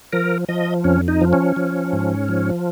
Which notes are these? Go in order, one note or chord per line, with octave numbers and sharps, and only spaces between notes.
F3 A#4
F3 D#5
F2 C#4
D#4
F3
C#4
F3
G#2
F3